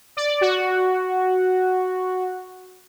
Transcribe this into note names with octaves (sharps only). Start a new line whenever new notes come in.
D5
F#4